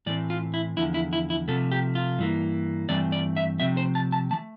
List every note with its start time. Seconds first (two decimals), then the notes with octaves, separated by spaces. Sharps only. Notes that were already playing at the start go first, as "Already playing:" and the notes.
0.06 A2 E3 A3 C4 D5
0.30 F4
0.54 E4
0.77 E2 D3 F3 E4
0.94 E4
1.13 E4
1.30 E4
1.48 C3 F3 A3 A4
1.72 G4
1.95 F4
2.18 G2 E3 A#3
2.89 G2 E3 A3 C4 D5
3.12 D5
3.37 E5
3.60 C3 F3 A3 C4 E5
3.77 C5
3.95 A5
4.12 A5
4.31 E3 A3 A5